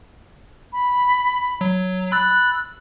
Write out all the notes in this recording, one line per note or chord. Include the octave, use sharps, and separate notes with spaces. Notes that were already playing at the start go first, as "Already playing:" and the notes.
B5
F#3
B5 E6 F#6 A6